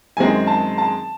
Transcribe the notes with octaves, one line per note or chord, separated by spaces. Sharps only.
F#2 D#3 G#3 C4 G#5
A5
A5